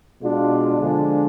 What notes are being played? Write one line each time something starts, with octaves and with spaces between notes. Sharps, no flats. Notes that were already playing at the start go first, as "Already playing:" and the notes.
B2 G#3 D4 F4
D3 F3 G#3 D4 F4